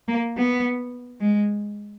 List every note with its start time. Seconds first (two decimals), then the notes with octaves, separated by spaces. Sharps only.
0.08 A#3
0.37 B3
1.20 G#3